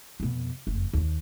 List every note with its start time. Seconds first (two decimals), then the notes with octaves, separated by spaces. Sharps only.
0.20 F2 B2
0.67 F#1 F2
0.93 D#2 D#3